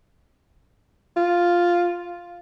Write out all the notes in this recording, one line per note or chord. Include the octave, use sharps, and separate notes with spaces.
F4